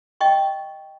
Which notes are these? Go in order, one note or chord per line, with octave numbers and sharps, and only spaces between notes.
D#5 G5 C#6